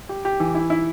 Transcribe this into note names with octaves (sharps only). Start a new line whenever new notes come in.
G4
G4
E3
E4
E4